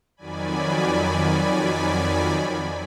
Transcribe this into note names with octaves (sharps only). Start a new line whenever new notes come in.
F2 D#3 F#3 D5 G#5 B5